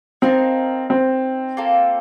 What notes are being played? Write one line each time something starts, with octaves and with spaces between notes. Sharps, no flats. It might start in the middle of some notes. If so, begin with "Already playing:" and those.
C4 D#4 A#4 F5 A5
C4
A#3 F4 A4